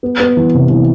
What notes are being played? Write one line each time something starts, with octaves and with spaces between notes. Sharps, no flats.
B3
B3
E3
C3
E3